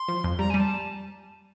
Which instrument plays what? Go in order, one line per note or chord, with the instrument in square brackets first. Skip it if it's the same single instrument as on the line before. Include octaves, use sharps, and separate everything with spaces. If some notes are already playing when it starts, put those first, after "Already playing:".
Already playing: [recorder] C6
[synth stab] F3
F2
[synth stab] G3 [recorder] A#5
[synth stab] G3 [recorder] G#5
[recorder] A5